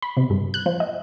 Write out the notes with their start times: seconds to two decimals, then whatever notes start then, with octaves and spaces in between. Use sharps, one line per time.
0.02 B5
0.17 C3
0.30 G2
0.54 F#6
0.66 F3
0.80 D#5